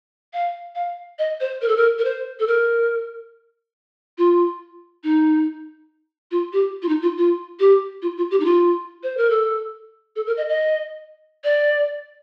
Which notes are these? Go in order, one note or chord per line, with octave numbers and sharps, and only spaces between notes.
F5
F5
D#5
C5
A#4
A4
A#4
A#4
C5
A4
A#4
F4
D#4
F4
G4
F4
D#4
F4
F4
G4
F4
F4
G4
D#4
F4
C5
A#4
A4
A4
A#4
D#5
D#5
D5